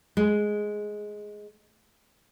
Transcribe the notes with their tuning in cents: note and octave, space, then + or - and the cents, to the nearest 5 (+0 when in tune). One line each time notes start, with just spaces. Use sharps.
G#3 +5